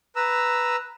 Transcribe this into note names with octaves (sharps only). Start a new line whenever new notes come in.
B4 A#5 E6